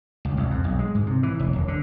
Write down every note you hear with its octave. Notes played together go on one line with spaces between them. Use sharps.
C#2
C2
F2
B1
G#3
G#2
C3
E3
F1
D#1
D3